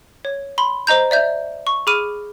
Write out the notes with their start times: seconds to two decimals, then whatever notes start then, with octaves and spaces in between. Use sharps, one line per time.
0.25 C#5
0.58 B5 C6
0.87 C5 D#5 A#5 G6
1.11 D5 E5 G6
1.67 C#6
1.87 G#4 B5 D6 F6 D#7